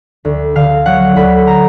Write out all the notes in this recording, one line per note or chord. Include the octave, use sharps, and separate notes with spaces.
D2
D3 F5
F#3 F#5
D2 B5
A#5